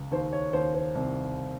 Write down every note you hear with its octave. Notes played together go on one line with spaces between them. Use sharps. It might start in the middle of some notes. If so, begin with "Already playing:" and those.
Already playing: C#2
D#2 C5
C#5
D#2 C5
C5
C2